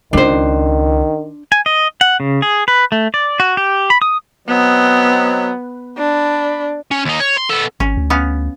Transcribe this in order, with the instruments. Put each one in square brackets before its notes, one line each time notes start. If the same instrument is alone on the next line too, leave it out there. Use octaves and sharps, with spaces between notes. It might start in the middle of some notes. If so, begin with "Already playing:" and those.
[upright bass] C#2 F4 [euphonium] D#3 [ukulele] D4 C5
[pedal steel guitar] G#5
D#5
F#5
C#3
G#4
B4
A3
D5
F#4
G4
B5
D#6
[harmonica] F#3 C4 D#5 [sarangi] B3
[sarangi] D4 [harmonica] B5
[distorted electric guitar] C#4
D#2 D#4
C#5
C6
B3 A4
[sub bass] G#1 [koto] C#4
[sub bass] D2
[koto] B3 C#4 F5